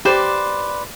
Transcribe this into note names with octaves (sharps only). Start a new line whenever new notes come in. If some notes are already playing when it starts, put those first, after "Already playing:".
G4 B4 C5 D5